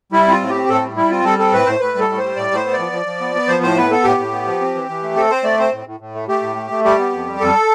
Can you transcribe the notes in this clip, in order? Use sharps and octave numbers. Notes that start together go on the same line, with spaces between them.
G3 E4
C4 F4
A2
G4
C4
A2 A4
G3
G3 E4
C4 F4
G3 A4
C4 A4
A2 B4
A2 C5
A2 B4
G3 A4
A2
G3 C5
A2 D5
A2 C5
B3
D5
F3
F3
F3
B3
B3
F3 C5
A2 C5
B3 B4
B3 A4
A2 G4
A2
B3
F3
C4
E3
E3
A3
C4 A4
C4 C5
A3 D5
C4 C5
A2
A2
A2
A3
A3 G4
A2
A3
A3
G3 G4
B3
F2
G3
F2 A4